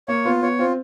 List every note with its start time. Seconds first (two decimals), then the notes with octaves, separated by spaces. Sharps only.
0.08 A#3 C#5
0.25 B3 F4
0.42 B3 C#5
0.59 C4 F4